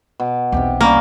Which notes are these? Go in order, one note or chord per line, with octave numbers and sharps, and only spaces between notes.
B2
B1 E2 C3 G4
G3 A#3 C#4 A#4